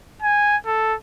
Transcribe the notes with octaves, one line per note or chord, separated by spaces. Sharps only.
G#5
A4